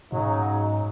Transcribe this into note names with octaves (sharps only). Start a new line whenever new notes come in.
G#2 C#3 F#3 D#4